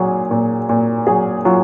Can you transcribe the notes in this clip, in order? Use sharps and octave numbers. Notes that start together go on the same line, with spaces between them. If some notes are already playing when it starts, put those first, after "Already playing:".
Already playing: A#2 F#3 G#4
A#2
A#2
F#3 G#4
F#3 F4